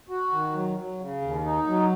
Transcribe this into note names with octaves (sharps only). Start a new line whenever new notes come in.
F#4
D#3
F#3
F#3
C#3
D#2
D#4
F#3